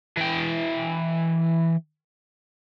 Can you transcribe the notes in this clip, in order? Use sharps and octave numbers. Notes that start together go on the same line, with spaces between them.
E3 G5